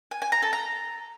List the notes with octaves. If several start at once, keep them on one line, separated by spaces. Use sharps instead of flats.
G#5
G#5
A#5
A4
A#5